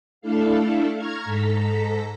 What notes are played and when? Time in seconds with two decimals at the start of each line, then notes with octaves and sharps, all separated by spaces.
0.21 A3 D4 E4 A4 F5
0.96 A#5 C#6 F6 G#6
1.25 G#2 A4 A#5 B6